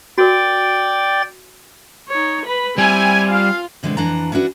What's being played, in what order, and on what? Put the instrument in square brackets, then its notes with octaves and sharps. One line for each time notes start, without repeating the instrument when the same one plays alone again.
[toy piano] F#4 A#4 [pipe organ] D5 G5 A6
[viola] D#4 C#5
B4 B5
[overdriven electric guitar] G3 [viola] C4 E4 [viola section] G#5
[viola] F4 [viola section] F5
[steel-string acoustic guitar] B2 D3 E3 G#3 C4
F2 E3 D4 A5 A#5
C#4 D4 E4 F#4 B4